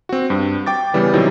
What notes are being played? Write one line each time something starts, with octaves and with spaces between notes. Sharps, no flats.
C4 F#4
G2
G5 D6 A6
C#3 E3 G3 B3
C3 D#3 F#3 D#4 E4